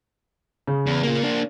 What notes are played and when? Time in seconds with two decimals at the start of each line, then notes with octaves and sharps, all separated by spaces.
0.67 C#3
0.86 E2
1.03 A#3 F4
1.23 A#3 D4